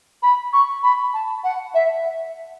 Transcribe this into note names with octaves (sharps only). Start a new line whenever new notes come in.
B5
C#6
B5
A5
F#5
E5